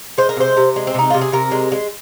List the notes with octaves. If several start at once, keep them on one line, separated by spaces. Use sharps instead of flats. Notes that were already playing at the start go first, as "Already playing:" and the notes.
G#3 C5
A#4
C3 C5
C3
G#3
C4
C3 D#4
C3 F4
G#4
C3 A#4
G#3
G#3